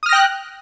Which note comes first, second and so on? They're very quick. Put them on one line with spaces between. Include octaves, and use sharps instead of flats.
D#6 F6 A#6 G5 F#6